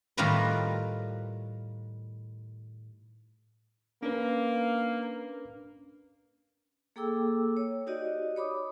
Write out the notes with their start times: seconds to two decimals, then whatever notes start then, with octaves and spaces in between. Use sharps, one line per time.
0.17 A2 D#3 G3 F4 A#4 B4
4.03 A#3 C#4 D4 B4
6.96 A#3 G#4 A4 G5 D6 E6
7.57 C#5
7.87 D#4 F#4 G4 D5 D#5
8.36 C#5 B5 D6 D#6